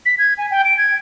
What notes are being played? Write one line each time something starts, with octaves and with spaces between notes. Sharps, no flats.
B6
G#6
G#5
G5
D7
G#6